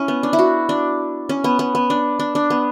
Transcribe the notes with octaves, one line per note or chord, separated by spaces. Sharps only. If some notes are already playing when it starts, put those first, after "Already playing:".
Already playing: C#4 E4
B3
D4
E4
F#4
D4
C#4
B3
B3
B3
D4
D4
D4
B3